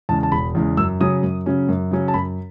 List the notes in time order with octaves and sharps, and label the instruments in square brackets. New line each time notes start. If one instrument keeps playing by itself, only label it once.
[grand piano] E2 C#3 G#3 A5
A5
E1 B5
E2 C#3 G#3
F#2 E6
C#3 F#3 C#4 D#6
F#2
C#3 F#3 C#4
F#2
C#3 F#3 C#4
A5
F#2 B5